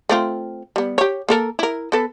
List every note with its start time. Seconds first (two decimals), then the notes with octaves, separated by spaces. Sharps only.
0.09 A3 C4 F4
0.76 G3 B3
0.98 G4 C#5
1.29 A#3 A4 A#4
1.59 E4 A#4
1.92 B3 A4 B4